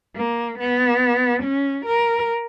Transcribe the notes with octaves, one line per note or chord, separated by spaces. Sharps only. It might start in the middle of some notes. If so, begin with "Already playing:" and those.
A#3
B3
C#4
A#4